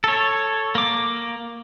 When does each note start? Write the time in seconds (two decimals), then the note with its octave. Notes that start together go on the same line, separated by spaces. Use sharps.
0.04 A4 C#5
0.75 A#3 D6